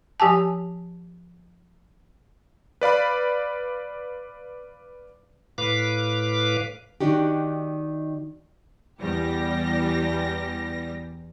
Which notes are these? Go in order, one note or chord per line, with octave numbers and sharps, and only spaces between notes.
F3 G4 G#5 A5
B4 D5 F5 B5
A2 B4 F5 D6
D#3 D4 D#4 F#4 G4
E2 G3 G4 A#6